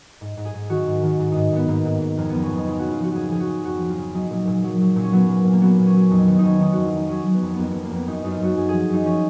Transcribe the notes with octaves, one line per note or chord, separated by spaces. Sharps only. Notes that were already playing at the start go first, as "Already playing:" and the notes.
G#2
G#2
G#4
G#2
D#3 F#4
G#2
D#3
G#2
G#2 D#4
G#2 B3
G#2 A#3
G#2
G#2
F2 A#3
F2 B3
C#4
F2 D#4
C#3 F4
C#3 F#4
F4
F3 F#4
F2 F#4 G#4
F3 G#4
F#4
C#3
F2 F#4
F3
F4
C#3
F#3 D#4
A#2
A#2
F#3
F#3
A#2
C#4
F#3 B3
A#2
A#2
A#3
F#3 B3
A#2
C#4
F#3
F2 C#4 D#4
D#3 B3
F2 C#4 D#4
D#3 D#4
F2 F#4
F4
F2 D#4
F#3 C#4
F#3
B3
F2
B3
F2 A#3
F2 B3
A#3
F2 B3
F#2 D#4
F#2 D#4
F4
F#2 F#4
F#2 G#4
F3 G#4
F#2 D#4
F3 C#4